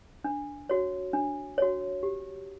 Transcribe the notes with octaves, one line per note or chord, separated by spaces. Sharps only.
D4
F#4 C#5
D4
F#4 C#5
G4